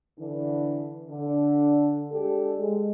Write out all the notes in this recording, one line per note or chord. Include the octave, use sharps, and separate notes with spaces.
D3 E3 D4
D3 D4
G#3 D4 G4 A4
G#3